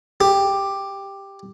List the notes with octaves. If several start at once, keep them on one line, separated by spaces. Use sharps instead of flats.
G4